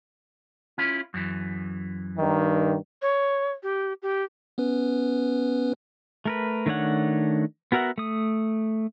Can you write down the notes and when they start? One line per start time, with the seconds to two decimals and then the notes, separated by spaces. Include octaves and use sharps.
0.78 C#4 E4 F4
1.14 F#2 E3
2.17 G2 D#3
3.02 C#5
3.63 G4
4.02 G4
4.58 B3 C#4 B4
6.25 A3 A#4 B4
6.66 D#3 A3 D4 C#5 F#5
7.72 B3 F#4 A#4 E5 F#5
7.98 A3 D#6